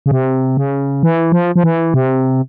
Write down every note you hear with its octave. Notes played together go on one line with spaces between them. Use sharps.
C#3
C3
C#3
E3
F3
F3
E3
C3